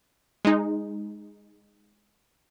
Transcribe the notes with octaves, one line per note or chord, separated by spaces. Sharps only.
G#3 D#4